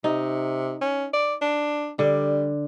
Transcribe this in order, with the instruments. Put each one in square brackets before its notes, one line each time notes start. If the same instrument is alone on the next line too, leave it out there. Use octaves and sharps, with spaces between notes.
[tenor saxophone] C3 [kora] D#4
[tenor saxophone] C#4
D5
D4
[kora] D3 [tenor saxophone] G3